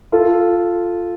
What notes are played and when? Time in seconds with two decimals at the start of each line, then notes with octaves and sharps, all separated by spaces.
0.12 F4 A4